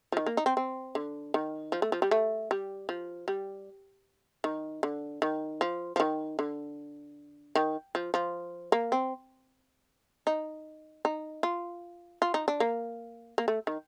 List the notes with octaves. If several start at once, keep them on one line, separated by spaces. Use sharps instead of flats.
F3
D#3
A#3
D#4
C4
C4
D3
D#3
F3
A3
F3
G3
A3
G3
F3
G3
D#3
D3
D#3
F3
F3
D#3
D3
D#3
F3
F3
A#3
C4
D#4
D#4
F4
F4
D#4
D4
A#3
A#3
A3
D#3